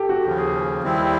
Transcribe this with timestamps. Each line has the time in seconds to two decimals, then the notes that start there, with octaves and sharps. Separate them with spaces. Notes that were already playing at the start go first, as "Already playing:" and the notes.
Already playing: G4 A4
0.09 F#4
0.24 D#2 C#3 F3 G4
0.38 G#4
0.83 D#2 D#3 G3 C4 E4